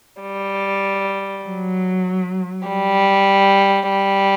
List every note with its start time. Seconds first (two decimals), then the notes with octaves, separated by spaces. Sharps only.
0.22 G3
1.45 F#3
2.67 G3
3.90 G3